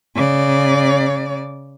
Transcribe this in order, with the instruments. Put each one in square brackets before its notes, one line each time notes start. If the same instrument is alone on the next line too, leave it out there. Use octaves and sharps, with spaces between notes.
[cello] C#3 D5